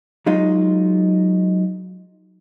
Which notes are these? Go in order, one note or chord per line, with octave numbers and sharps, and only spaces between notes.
F#3 G#3 D#4 F4